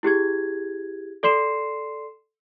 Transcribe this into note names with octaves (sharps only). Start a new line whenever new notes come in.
E4 G4 G#4 G#6
A4 D5 C6 C7 E7